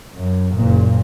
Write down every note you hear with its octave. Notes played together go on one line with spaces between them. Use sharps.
F#2
F#1 A#2